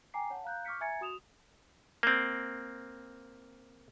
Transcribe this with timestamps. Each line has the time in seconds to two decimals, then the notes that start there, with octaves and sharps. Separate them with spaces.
0.14 G5 G#5 A#5 D6 C7
0.30 C#5 F#5 A5
0.44 F5 A#5 F#6 G6
0.65 C#6 D6 F6 G6 B6 C#7
0.81 E5 G#5 A#5 G#6 A6 C#7
1.01 F#4 D#6 E7 F7
2.03 A#3 C4